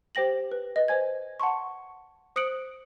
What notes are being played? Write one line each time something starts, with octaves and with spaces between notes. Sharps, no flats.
G4 C5 G5 A#6 F#7
B4
B4 D#5
C5 G#5 G#6
F#5 A5 C6 C#6
C5 D#6 F#6 C#7 D7 F#7